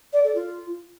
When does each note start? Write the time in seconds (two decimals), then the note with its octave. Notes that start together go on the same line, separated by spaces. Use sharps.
0.13 D5
0.24 A4
0.35 F4